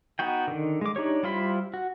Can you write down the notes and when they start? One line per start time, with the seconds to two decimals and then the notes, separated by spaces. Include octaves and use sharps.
0.19 B3 D#4 F#4 G5
0.47 D3 D#3
0.81 G#3 D6
0.96 D4 D#4 G4 C#5
1.23 G3 E4 F4 C5 B5
1.74 F#4